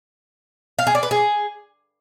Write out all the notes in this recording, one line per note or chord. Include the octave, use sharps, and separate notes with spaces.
F5
G#4
D5
B4
G#4